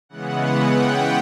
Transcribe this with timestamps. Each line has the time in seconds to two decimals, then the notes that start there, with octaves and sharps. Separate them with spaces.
0.09 C#3 E3 G#3 B3 F#5
0.40 F#5
0.71 G5